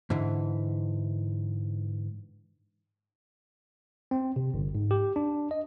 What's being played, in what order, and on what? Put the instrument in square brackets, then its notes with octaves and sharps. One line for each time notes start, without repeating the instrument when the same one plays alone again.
[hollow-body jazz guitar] G#2 D3 E3
[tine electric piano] C4
C3
G1
G#2
G4
D4
D#5